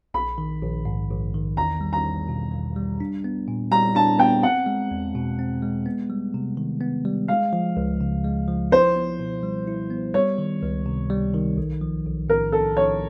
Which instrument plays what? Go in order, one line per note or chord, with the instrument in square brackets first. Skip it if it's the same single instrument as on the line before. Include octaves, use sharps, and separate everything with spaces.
[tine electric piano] A#1 [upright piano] B5
[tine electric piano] D#3
A#1
G#2
A#1
D#3
[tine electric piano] E2 [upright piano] A#5
[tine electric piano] G3
[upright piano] A#5
[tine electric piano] E2
B2
E2
G3
D4
B3
A#2
[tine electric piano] G3 [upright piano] A#5
[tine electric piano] D4 [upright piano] A5
[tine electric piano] B3 [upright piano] G5
[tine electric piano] C4 [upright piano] F#5
[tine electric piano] G#3
E2
B2
C4
G#3
B3
G3
C3
D#3
B3
G3
[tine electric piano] G#3 [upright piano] F5
[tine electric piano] F3
C#2
C#3
G#3
F3
[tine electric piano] E4 [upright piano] C5
[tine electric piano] B3
B2
G3
E4
B3
[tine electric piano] G3 [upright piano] C#5
[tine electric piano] D#3
C#2
C3
G3
D#3
B1
F3
B1
[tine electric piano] A2 [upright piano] A#4
[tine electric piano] B1 [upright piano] A4
[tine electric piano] F3 [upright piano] C#5